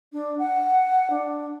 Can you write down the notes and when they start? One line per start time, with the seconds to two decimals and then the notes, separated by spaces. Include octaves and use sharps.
0.12 D4
0.39 F#5
1.10 D4